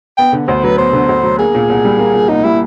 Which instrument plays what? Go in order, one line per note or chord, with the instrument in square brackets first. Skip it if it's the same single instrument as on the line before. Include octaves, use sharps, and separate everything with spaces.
[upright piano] B3 [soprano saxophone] G5
[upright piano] D3
[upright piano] D2 [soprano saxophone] C5
[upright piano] F#3 [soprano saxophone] B4
[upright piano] B3 [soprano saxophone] C5
[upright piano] D3
D2
F#3
[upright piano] A#3 [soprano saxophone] G#4
[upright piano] A#2
C2
G3
A#3
A#2
[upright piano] C2 [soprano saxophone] D#4
[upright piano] G3 [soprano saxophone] E4